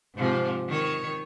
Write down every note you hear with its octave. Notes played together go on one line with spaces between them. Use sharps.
G#2 C3 F3
D#3 C#5